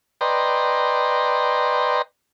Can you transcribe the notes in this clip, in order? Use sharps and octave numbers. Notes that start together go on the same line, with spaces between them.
B4 D5 D#5 G5 A#5 C6